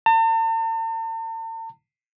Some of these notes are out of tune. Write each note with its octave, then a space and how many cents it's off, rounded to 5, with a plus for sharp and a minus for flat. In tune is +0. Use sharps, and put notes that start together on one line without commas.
A5 +45